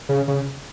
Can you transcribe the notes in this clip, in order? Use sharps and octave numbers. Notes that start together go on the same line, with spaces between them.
C#3
C#3